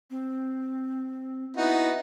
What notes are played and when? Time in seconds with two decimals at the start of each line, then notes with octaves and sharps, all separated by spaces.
0.10 C4
1.57 B3 D#4 E4 F#4